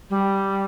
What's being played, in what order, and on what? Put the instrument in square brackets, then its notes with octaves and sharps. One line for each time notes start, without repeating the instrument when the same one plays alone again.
[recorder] G3